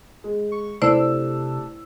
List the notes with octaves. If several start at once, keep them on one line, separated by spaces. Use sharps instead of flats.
G#3
C#6
C3 A3 D4 E4 C5 D5 E6